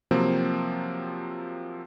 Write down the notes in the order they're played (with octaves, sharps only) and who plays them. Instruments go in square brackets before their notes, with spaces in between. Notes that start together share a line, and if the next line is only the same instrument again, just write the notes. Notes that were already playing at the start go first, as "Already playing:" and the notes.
[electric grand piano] C3 F3 F#3 A#3 C4